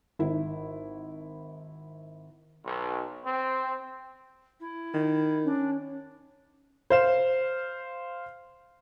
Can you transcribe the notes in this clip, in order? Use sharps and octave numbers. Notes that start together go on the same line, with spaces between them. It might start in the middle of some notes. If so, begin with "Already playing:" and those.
G#1 E4
B1
C4
E4
D#3
C#4 D4
C5 F5 E7